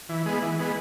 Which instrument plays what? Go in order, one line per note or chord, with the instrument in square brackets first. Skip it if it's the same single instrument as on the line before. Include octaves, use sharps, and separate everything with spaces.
[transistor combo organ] E3
G#3 B3
E3
G#3 B3